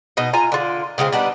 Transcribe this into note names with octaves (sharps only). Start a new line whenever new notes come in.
B2 D#4 D#5
F4 G#5 A#5
D3 F4
C#3 G#3 B3 C4
G3 B3 D4 D#4